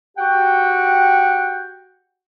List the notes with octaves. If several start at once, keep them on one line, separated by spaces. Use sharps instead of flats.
F#4 G4 F#5 G5